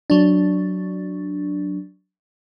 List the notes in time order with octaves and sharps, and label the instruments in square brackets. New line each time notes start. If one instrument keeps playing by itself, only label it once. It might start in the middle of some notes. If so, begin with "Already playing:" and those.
[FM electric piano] F#3 D4